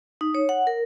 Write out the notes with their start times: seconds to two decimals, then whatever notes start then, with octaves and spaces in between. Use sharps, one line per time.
0.21 D#4
0.35 C#5
0.49 F#5
0.67 A#4